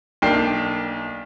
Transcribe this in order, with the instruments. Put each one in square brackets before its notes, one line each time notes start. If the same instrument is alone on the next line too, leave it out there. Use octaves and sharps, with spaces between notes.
[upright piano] B1 A#3 D4 G5 C7